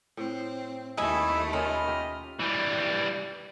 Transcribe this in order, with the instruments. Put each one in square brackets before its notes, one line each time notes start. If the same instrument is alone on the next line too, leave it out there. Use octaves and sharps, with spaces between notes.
[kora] A2 [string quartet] C4
[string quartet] D#2 A3 [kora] G3 [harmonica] E4 [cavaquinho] D#5 G#5 B5
[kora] C#4 F4 A#4 [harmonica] D#5 F6 [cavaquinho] B5
[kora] F4 G4 E5
[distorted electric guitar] E3 G3